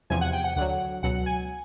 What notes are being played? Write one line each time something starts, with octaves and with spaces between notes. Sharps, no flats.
E2 C3 F3 G#5
F#5
G5
F#5
D2 D3 F#3 F#5
C#2 B2 F#3 F#5
G#5